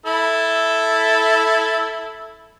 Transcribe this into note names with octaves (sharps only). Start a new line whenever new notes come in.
E4 A4